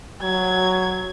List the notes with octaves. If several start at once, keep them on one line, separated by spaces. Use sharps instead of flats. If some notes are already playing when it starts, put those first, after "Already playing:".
F#3 G#6